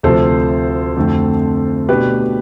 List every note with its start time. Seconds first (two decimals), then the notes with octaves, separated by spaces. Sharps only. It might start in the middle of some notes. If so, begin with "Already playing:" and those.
0.03 D2 C3 F3 A4 C5
0.97 F2 D3 A3 C4
1.89 B2 A3 D4 G4 B4